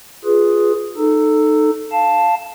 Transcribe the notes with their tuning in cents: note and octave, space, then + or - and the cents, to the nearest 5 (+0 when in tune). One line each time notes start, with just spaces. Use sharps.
F4 +5 G#4 +0 B4 +0
D#4 -20 A4 +0
F5 +0 A5 +0